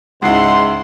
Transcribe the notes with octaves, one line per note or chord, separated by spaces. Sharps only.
C#2 G#2 E4 F#5 C6